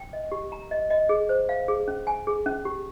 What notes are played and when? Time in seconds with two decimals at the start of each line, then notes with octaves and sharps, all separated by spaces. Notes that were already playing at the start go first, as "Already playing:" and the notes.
Already playing: G5
0.13 D#5
0.32 G4
0.52 A#5
0.71 D#5
0.90 D#5
1.09 G#4
1.29 C5
1.49 F5
1.68 G#4
1.88 C#4
2.07 G#5
2.27 G#4
2.46 C#4
2.65 G4